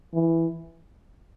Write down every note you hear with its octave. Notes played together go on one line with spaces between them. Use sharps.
E3